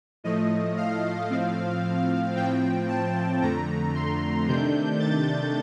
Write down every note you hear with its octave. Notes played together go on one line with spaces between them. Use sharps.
A2 F3 A3 D#5
F5
A2 F3 C4
A2 F3 C4 G5
A5
F2 D3 A3 A#5
C6
C3 D#3 A3 D4 G6
A6